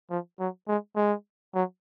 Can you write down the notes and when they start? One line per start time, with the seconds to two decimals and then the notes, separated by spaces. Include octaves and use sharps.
0.10 F3
0.40 F#3
0.68 G#3
0.96 G#3
1.55 F#3